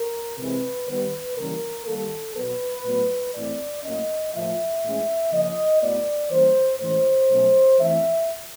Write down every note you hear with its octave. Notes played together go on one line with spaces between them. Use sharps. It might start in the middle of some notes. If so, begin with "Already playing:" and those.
Already playing: A#4
C3 E3 G#3 C4 B4
D#3 G3 B3 B4
C#3 E3 G3 A#3 C#4 A#4
D#3 G3 A#3 A4
B2 F#3 B3 B4
A2 F#3 B3
A2 E3 A3 C4 D5
A2 F#3 A#3 C#4 D#5
A2 F3 A#3 E5
A2 E3 G#3 C#4
C#3 F3 A#3 C#4 D#5
A2 F#3 B3 D5
E3 G3 A#3 C#4 C5
A2 E3 G#3 C#4 C5
B2 F#3 A3 C#4
E3 A3 C4 E5